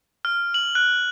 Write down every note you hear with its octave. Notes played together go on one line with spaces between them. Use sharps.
F6
F#7
F#6